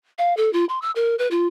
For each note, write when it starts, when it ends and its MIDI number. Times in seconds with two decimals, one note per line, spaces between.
0.18 0.36 77
0.37 0.52 69
0.53 0.65 65
0.69 0.81 84
0.82 0.91 88
0.95 1.15 70
1.19 1.28 71
1.31 1.47 65